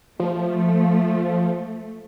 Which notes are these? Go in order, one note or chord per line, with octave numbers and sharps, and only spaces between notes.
F3 A3